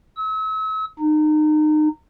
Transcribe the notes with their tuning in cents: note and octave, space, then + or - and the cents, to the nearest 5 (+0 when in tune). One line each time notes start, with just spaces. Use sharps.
E6 -40
D#4 -30